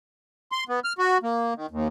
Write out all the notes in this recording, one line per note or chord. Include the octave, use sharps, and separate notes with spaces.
C6
B3
F6
F#4
A#3
D#3
D#2